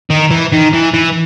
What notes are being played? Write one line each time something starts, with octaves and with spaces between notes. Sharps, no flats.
D#3
E3
D#3
E3
E3